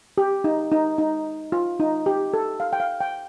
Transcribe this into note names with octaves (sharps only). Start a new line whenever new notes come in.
G4
D#4
D#4
D#4
F4
D#4
G4
A4
F5
G5
F5
G5